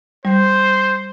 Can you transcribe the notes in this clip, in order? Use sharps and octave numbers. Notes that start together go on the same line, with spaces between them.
G3 C5